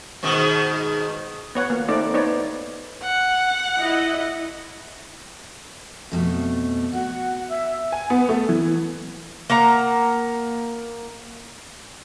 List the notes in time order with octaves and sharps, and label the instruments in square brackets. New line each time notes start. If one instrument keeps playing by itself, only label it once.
[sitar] G#2 B2 D#3
[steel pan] B3 C#5 F#5
A#3
A3 C4 D#4 D5
B3 D#4 C#5 D5
[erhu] F#5
[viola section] E4 D#5
[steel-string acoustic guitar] F2 B2 A3
[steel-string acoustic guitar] F#4 [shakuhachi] F#5
[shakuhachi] E5
[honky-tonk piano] G#5
B3
A3
E3
[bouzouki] A#3 F#5 A#5